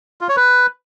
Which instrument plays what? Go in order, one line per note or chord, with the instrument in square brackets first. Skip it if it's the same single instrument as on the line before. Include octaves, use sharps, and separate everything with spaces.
[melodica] F4
C#5
B4